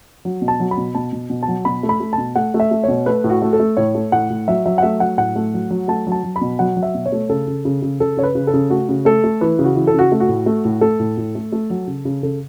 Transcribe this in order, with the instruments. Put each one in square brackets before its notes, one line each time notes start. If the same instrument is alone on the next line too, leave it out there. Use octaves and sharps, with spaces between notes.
[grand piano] F#3
B2
A5
F#3
B5
B2
B2 A5
B2
B2
A5
F#3
B2 B5
A3
B5
A3
A5
B2
A3 F#5
A3
E5
A3
B2 C#5
A3 B4
A2
F#4
A3
A4
A3
A2 C#5
A3
A2 F#5
A2
F#3 E5
F#3 E5
F#5
A3 E5
F#3 F#5
A2 F#5
A3
F#3
F#3
A3 A5
F#3 A5
F#3
B5
B2
F#3 F#5
F#3
E5
B2
C#5
A3
C#3 A4
C#3
C#3
C#3
C#3 A4
C#3 C#5
B4
C#3
A4
C#3
A3 F#4
C#3
A3 A4
A3
E3 B4
C#3
F#4
E3
A4
C#3 F#4
A3
F#4
A2
A3
A2
A3 A4
A2
A2
A3
A3
F#3
C#3
C#3
C#3 A4